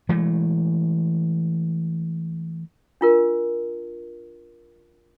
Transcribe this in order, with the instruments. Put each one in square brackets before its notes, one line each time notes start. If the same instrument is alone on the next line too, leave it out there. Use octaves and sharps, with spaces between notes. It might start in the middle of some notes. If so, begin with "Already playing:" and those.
[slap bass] E3 G#3 A3
[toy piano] D4 F4 A#4